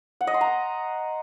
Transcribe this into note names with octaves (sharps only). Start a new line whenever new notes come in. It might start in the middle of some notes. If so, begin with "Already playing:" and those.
F#5
D#5
C6
A#5